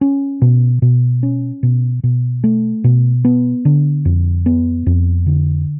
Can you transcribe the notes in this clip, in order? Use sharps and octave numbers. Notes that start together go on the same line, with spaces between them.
C#4
B2
B2
C#4
B2
B2
A3
B2
B3
D3
F2
B3
F2
D3